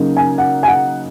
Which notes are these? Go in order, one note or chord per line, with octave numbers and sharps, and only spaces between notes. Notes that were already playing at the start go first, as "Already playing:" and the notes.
Already playing: C#3 F#3 A#3 D#4
G#5
F#5
G#5
F#5